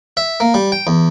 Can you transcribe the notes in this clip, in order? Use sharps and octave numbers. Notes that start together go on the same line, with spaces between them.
E5
A#3
G3
G5
E2